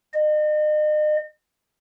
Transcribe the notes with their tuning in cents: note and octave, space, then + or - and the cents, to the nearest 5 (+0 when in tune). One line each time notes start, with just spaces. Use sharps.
D#5 -40